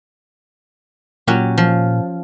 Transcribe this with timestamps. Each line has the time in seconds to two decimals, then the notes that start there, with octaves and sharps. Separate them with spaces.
1.27 A#2 F#3 C#4 G4
1.58 F3